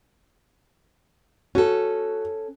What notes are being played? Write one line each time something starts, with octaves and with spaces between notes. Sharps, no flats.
C#4 F#4 A4